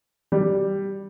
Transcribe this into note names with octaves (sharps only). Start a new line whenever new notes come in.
G3